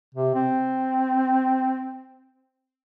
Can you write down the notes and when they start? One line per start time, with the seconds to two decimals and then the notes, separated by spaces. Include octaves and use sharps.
0.14 C3
0.35 C4